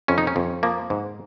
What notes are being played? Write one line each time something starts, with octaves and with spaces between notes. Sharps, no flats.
F2 C#4
D#4
C#4
F2
F3 A#3
G#2